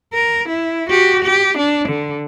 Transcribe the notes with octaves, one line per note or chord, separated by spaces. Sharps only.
A#4
E4
F#4 G4
G4
D4
D3